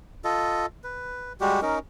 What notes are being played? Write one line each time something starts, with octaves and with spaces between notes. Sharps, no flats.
F4 A4 D#5
B4
G3 G#3 F#4 G4
C#4 D#4 A#4